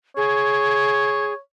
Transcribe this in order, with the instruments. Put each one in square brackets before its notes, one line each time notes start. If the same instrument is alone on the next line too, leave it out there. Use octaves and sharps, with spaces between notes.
[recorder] G#4 [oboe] C#5